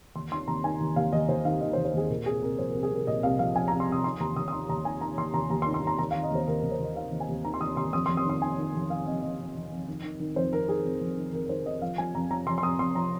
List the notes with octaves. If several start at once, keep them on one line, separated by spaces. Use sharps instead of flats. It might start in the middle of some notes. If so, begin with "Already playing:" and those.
D#2 C6
D#3 C6
D#2 A#5
D#3 G#5
D#2
D#2 F5
D#2 D#5
D#2 C5
D#3 F5
D#3 D#5
C5
D#2
C5
D#2 G#4
A#2 A#4
C2 G#4
C2 A#4
F3 C5
C2 A#4
G#4
C2 A#4
A#2 D#5
C2 F5
F3 F5
F3 G#5
C2 A#5
C6
C2 D#6
D#3 C6
D#2 A#5
D#2 D#6
D#6
D#3 C6
D#2 A#5
D#3 G#5
D#3 A#5
D#2 C6
D#2 A#5
D#2 A#5
C6
D#3
C6
D#3 A#5
D#2 A#5
D#3 F5
D#5
D#2 C5
D#2 A#4
D#2 A#4
C5
D#2 D#5
D#3 F5
D#2
G#5
D#2
D#3 A#5
C6
D#2 D#6
D#2 C6
F2 D#6
F2 C6
D#6
D#3 C6
D#3 G#5
D#3
F2
F2 F5
F2 D#5
F2 D#5
F2
F2
F2
D#3
D#3
D#3
F2 C5
D#3 A#4
D#3 G#4
F2
F2
D#3
F2 A#4
A#4
D#3 C5
D#3 D#5
F3 F5
F3 G#5
F2 A#5
F3 A#5
F2 C6
C6
F2 D#6
F2 C6
F3 A#5